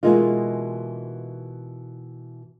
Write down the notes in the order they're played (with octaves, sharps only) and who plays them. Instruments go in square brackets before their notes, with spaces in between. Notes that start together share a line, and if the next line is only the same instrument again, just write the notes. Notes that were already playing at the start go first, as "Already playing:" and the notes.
[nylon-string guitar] B2 E3 G#3 A#3 D#4 F4